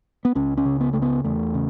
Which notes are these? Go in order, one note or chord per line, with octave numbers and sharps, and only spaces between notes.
B3
C#2 C#4
C#4
C#3
B3
C#2 A3
B3
E2 A3
C#3